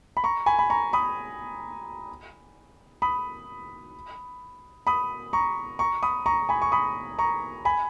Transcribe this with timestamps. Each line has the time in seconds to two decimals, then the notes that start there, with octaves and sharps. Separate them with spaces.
0.17 B5
0.24 A#5 C#6
0.46 G#5 B5
0.59 B5
0.70 A#5 C#6
0.93 B5 D#6
3.02 B5 D#6
4.87 B5 D#6
5.33 A#5 C#6
5.79 A#5 C#6
6.03 B5 D#6
6.26 A#5 C#6
6.49 G#5 B5
6.62 C#6
6.72 B5 D#6
7.19 A#5 C#6
7.65 G#5 B5